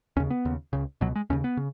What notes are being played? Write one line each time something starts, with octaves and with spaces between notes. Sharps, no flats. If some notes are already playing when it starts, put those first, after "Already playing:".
D#2 C#3 C#4
B3
D#2 C#3
C#2 C#3
C#2 B2 F#3
G#3
D#2 C#3 C#4
B3
C#3